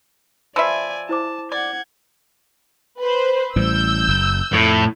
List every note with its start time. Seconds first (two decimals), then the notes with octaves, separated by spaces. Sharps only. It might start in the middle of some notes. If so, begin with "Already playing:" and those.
0.56 F3 B4 D5 E5 G#5 E6
1.09 E4 C5 A5 D6
1.52 D5 F#5 G#6
2.99 B4 C5
3.56 A1 A2 G3 E6 G6
4.08 F#1 F#2
4.53 F2 A2